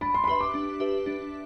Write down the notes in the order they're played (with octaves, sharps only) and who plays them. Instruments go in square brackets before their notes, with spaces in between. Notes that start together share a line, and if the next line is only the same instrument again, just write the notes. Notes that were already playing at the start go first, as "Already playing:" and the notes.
[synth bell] D4 [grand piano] B5
[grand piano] C6
B5
[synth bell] G4 B4 E5 [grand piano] C6
[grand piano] D6
[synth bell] D4
G4 B4 E5
D4